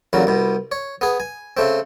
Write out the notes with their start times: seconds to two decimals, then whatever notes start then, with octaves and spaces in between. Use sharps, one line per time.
0.13 A1 A#2 C#3 F#3
0.27 C2 B2
0.72 C#5
1.01 B3 G#4
1.20 G#5
1.57 C#3 A3 C4